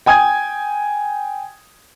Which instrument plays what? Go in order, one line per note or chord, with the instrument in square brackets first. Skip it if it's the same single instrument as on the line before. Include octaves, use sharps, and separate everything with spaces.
[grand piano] G5 G#5 D#6 G#6